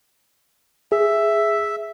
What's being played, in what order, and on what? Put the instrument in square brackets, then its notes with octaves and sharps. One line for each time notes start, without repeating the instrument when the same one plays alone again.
[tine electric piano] G#4 [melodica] E5